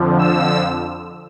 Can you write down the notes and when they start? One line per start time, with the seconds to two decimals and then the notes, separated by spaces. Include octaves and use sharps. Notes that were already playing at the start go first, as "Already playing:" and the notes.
Already playing: F2 D3 F3
0.19 E6